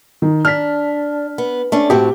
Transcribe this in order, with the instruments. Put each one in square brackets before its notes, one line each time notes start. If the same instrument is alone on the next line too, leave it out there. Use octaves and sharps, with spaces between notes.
[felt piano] D#3
[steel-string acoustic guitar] D4 [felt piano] F6 B6
[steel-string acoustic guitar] B3
A3 C#4 D4
[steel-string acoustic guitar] A2 C4 F#4 [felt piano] G4